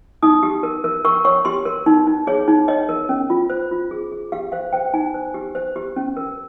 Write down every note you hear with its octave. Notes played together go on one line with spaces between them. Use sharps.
D#4 D#6
G4
A#4
A#4
A#4 C#6
C#5 C#6
G4 C6
A#4
D#4
D#4
G#4 C#5
D#4
C#5 D#5
A#4
C#4
F4
C5
F4
G#4
G#4
G4 F5
C5 F5
C5 G5
D#4 G#5
C5
G4
C5
G4
C#4
A#4